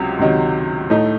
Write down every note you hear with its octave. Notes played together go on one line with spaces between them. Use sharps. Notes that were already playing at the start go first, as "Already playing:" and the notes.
Already playing: C#2 C3 F#3
C#2 C3 D#3 F#3
A2 A3 D#4